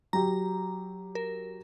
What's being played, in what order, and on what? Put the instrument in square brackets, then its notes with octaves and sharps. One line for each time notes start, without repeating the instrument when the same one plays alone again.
[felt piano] F#3 G4 [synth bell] A#5
[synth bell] A#4